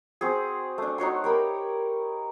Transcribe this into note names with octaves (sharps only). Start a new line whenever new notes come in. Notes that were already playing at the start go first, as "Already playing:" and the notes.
C4 F#4 G#4
A3 D4
D#4 F#4 C#5 C6
G4 A#4 B5